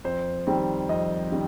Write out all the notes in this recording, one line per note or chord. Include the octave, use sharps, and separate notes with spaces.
F2 C5
D#3 G3 C4
F2 D#5
D#3 G3